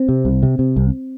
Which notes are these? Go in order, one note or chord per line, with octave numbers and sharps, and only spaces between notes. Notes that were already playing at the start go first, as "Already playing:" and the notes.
Already playing: C4
C3
C2
C3
C3
C2